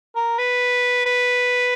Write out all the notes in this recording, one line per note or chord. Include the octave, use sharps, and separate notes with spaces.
A#4
B4
B4